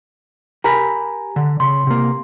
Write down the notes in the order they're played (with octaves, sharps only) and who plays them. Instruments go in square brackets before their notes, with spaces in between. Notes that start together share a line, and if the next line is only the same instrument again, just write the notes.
[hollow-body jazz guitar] G4 A#4 B5 [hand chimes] G#5 A#5
[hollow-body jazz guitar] D3
[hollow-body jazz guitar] C#3 [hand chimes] C6
[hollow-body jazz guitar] C3 A#3